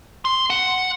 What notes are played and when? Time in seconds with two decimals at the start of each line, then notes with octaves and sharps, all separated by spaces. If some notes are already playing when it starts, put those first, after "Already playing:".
0.25 C6
0.50 F#5